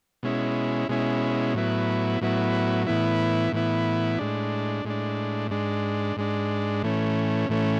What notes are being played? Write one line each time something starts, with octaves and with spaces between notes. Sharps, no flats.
B2 G#3 C#4 E4
B2 G#3 C#4 E4
A2 F#3 B3 E4
A2 F#3 B3 E4
A2 E3 B3 E4
A2 E3 B3 E4
A2 G#3 D4
A2 G#3 D4
G#2 G#3 D4
G#2 G#3 D4
A2 E3 A3 C#4
A2 E3 A3 C#4